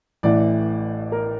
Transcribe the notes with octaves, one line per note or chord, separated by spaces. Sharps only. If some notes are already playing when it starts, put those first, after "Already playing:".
A1 A2 E3 D5
A#4